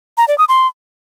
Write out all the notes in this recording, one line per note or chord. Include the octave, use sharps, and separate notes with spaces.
A#5
D5
D#6
C6